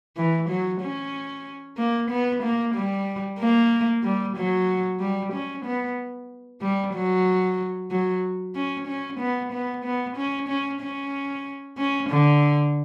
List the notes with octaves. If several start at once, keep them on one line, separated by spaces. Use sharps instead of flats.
E3
F#3
C#4
A#3
B3
A#3
G3
A#3
G3
F#3
G3
C#4
B3
G3
F#3
F#3
C#4
C#4
B3
B3
B3
C#4
C#4
C#4
C#4
D3